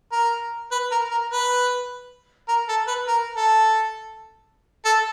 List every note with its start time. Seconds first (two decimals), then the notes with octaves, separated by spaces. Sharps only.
0.12 A#4
0.71 B4
0.91 A#4
1.11 A#4
1.30 B4
2.48 A#4
2.69 A4
2.87 B4
3.07 A#4
3.36 A4
4.85 A4